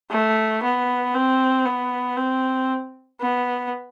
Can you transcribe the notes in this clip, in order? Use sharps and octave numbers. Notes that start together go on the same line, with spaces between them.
A3
B3
C4
B3
C4
B3